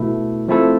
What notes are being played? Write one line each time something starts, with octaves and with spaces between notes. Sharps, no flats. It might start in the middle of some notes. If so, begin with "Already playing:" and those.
Already playing: B2 A3 E4
F3 A3 C4 E4 A4